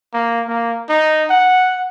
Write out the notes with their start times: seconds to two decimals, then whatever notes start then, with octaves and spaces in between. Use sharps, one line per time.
0.13 A#3
0.47 A#3
0.89 D#4
1.30 F#5